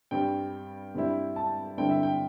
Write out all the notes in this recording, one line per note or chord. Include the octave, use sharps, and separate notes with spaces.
G2 G3 C4 G5
G2 G3 C4 E4
A5
G2 D3 C4 E4 G5
E5
G5